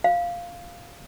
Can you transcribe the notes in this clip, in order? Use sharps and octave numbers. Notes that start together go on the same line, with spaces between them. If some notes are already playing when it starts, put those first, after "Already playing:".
F5